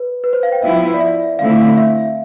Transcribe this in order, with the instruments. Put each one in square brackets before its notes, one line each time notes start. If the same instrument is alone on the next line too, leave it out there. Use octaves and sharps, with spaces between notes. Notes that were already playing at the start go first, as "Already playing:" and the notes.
Already playing: [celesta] B4
B4
C5
F5
G5
[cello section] F3 B3 E4 [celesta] E5
[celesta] D5
E5
[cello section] D3 A3 C4 E4 [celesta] F5
[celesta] E5